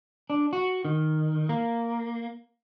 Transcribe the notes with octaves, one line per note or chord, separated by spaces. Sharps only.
D4
F#4
D#3
A#3